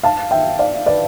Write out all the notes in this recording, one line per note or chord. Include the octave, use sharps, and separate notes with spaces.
F5 A5
E5 G5
D5 F5
B4 D5